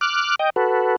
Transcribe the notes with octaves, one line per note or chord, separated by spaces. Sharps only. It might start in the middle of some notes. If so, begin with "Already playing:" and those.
D6 F6 F#6
D#5 G5
F#4 A4 B4